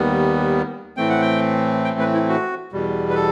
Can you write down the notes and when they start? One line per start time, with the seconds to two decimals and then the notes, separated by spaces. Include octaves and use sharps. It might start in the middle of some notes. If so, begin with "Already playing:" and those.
Already playing: D#2 D#3 G3 B3
0.97 A2 E3 A3 C4 G5
1.09 F#5
1.21 G5
1.84 G5
2.00 B4
2.14 E4
2.29 F#4
2.72 E2 B2 G3
3.10 B4
3.15 A4